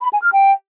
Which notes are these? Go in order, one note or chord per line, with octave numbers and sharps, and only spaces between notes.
B5
G#5
F6
G5